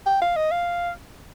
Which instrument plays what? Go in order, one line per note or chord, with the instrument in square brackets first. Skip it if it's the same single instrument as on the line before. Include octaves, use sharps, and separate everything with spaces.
[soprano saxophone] G5
F5
D#5
F5